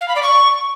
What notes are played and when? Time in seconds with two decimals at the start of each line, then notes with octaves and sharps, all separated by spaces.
0.01 F5
0.08 B5
0.16 D5
0.23 C#6